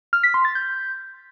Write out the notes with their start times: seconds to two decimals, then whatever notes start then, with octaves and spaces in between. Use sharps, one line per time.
0.13 F6
0.23 B6
0.34 C6
0.45 A6
0.55 G6